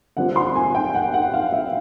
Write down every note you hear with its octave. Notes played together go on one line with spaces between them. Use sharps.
D3 G3 C4 F4 F#5
C6
G#5
G5
F#5
F#5
F5
E5